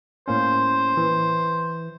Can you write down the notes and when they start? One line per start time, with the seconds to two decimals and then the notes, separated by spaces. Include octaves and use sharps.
0.28 A2 A#3 C#4 C5
0.97 E3